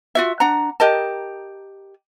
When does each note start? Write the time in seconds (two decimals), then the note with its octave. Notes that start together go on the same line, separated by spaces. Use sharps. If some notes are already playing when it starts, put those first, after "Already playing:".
0.15 F4 F#4 E5
0.40 D4 F#5 A#5
0.80 G4 A#4 D#5 A5